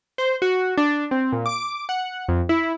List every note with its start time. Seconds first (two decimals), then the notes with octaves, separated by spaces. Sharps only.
0.18 C5
0.42 F#4
0.78 D4
1.11 C4
1.32 A#2
1.46 D6
1.89 F#5
2.29 F2
2.49 E4